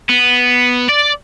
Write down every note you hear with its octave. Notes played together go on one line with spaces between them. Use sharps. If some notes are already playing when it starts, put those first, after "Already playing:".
B3
D5